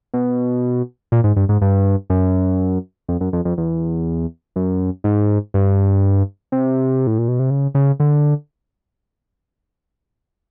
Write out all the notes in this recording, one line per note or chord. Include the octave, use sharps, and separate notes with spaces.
B2
A#2
G#2
G2
G#2
G2
F#2
F2
F#2
F2
F2
E2
F#2
G#2
G2
C3
A2
A#2
B2
C3
C#3
C#3
D3